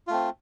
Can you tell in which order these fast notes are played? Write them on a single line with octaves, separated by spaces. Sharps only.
F4 A3 C4